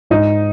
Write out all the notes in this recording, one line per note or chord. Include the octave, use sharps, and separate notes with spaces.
G#2 D#4